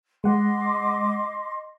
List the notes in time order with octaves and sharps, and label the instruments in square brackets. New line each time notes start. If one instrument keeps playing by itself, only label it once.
[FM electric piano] G#3 F#5 [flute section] D#5 C6 D6